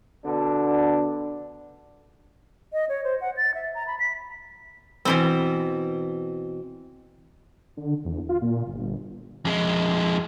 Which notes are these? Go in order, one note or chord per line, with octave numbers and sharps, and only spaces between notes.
B2 D3 D4
D#5
C#5
C5
F#5
A6
E5
A#5
B5
B6
B2 E3 C4
D3
E2
F4
A#2
G1
F2 G#3